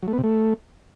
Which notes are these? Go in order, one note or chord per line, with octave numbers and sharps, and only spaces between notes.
F#3
A3
B3
C3
A3